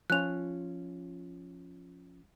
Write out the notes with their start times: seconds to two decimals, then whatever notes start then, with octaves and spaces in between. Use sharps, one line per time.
0.10 F3 C#4 F4 F#6 F7